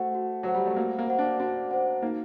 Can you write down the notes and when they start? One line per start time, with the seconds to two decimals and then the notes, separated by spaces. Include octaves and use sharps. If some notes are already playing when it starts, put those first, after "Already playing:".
Already playing: A3 F#4 C5 F#5
0.15 F#4
0.43 F#3 C5 F#5
0.54 G3
0.66 A3
0.76 A#3 F#4
0.98 A#3
1.09 C5 F#5
1.19 D4
1.40 D4 F#4
1.71 C5 F#5
2.02 A#3 D#4